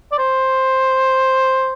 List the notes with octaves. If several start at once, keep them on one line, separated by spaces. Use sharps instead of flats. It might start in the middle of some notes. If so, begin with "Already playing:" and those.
D5
C5